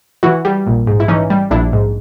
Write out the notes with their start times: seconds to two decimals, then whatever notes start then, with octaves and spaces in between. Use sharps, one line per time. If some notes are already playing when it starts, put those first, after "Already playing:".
0.23 E3 E4 F#4
0.45 G3
0.66 A#1
0.87 G#2
1.00 E4
1.08 E3 C#4 D#4
1.30 G3
1.51 A#1 D4 E4
1.73 G#2